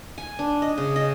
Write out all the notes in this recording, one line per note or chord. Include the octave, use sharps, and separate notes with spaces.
G#5
D4
D#5
C#3
D#5